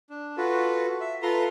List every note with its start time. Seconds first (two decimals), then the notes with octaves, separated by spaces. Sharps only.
0.10 D4
0.37 F4 F#4 A4 B4
1.00 E5
1.23 F4 A4 B4 A#5 C6